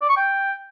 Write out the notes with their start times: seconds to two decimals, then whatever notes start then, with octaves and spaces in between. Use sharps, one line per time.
0.02 D5
0.09 C#6
0.17 G5